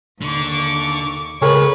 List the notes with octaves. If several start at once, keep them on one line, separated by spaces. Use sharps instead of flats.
D#2 D3 C#6 D6
C#2 G#4 A#4 B4 C#5